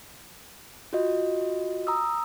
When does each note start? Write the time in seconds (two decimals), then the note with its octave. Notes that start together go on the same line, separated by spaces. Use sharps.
0.93 F4 F#4 D#5
1.87 A#5 D#6 E6